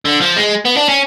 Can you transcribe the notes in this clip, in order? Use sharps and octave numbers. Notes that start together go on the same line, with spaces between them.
D3
F3
G#3
B3
D4
C#4